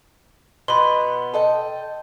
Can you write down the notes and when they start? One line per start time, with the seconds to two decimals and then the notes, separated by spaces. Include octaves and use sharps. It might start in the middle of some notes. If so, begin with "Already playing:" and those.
0.68 B2 B3 B5 C6
1.34 A4 D#5 G5